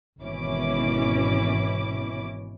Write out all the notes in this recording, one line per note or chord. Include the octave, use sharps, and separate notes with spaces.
G#1 B2 E3 C#4 E4 D6